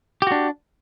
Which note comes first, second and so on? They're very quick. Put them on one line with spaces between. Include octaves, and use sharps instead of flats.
G4 F#4 D4